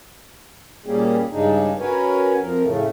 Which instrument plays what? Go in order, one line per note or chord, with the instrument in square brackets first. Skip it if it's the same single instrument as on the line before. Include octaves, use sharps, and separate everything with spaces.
[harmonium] A#2 G3 A#3 C#4 G4 G#4
G2 C#3 G#3 D4 D#4
C#4 F#4 A#4 B4 C#5 G#5
F2 F3 A#4
A2 C#3 A3